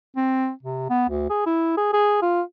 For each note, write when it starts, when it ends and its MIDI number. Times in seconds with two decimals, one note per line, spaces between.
0.16 0.51 60
0.63 0.86 48
0.90 1.07 59
1.09 1.29 38
1.30 1.44 68
1.46 1.72 64
1.77 1.88 68
1.93 2.18 68
2.22 2.42 65